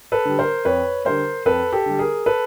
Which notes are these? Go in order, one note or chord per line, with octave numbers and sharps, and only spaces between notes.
A4 B4
D3 G3
A#4 C5
F2 B4 C#5
D3 G3 A#4 C5
F2 A4 B4
G4 A4
D3 G3
G#4 A#4
A4 B4